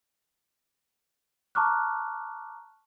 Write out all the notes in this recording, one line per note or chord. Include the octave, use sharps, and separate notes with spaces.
A5 A#5 C#6 D6 F6 F#6